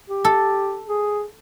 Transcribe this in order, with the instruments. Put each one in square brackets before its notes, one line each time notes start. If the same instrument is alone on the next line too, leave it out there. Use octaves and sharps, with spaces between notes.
[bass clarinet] G4
[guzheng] A4
[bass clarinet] G#4